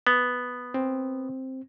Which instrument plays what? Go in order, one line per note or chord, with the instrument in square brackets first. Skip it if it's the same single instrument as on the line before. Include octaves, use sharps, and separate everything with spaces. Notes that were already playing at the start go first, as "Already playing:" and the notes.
[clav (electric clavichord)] B3
[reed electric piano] C4